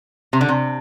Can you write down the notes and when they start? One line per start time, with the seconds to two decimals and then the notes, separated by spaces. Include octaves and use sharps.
0.33 C3
0.41 D3
0.49 C3